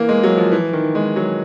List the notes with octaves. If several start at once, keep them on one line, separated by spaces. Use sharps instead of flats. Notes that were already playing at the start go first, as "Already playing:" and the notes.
Already playing: E3 A#3
G#3
F#3
F3
E3
D#3
G#3
F#3